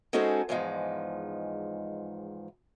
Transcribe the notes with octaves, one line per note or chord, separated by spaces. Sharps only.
G#3 C#4 D#4 F#4 A4 C5
E2 G#2 F3 G#3 D#4